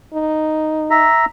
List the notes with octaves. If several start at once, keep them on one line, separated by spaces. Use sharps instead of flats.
D#4
E5 A#5